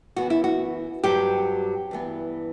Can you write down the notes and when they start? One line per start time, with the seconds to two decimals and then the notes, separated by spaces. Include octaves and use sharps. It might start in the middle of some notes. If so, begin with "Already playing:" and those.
0.16 F#2 E3 B3 F#4
0.30 E4
0.44 F#4
1.04 G2 F#3 C4 G4
1.91 G2 E3 B3